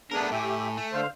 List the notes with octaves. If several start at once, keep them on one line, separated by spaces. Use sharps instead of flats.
A3 B3 D4 G#4 A#4
A2 G4 E5 G#5
A3
D3 C5 F5